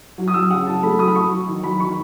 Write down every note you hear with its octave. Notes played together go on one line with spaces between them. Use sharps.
F#3
D#6
F#3 E6
C#3 F#5
F#3 A5
A3 B5
F#3 D#6
B5
F#3 C#6
F#3
D#3
F#3 B5
D#3 C#6